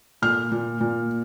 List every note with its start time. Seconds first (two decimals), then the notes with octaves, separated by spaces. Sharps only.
0.22 A#2 F6
0.52 A#2
0.80 A#2